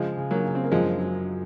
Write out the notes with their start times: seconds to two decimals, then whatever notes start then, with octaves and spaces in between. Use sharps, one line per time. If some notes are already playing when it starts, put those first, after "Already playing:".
Already playing: C#3 F3 G#3
0.17 C#3
0.31 F#3 A#3
0.45 C#3
0.55 C4
0.64 A#3
0.72 F#2 F3 G#3
1.00 F#3